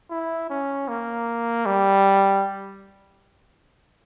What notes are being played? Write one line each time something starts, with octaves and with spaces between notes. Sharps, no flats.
E4
C#4
A#3
G3